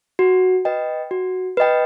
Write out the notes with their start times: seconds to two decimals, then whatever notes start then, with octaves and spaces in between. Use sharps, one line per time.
0.19 F#4
0.65 B4 D#5 G5
1.11 F#4
1.57 B4 D#5 G5